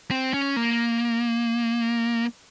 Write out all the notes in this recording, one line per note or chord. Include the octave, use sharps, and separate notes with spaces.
C4
C#4
A#3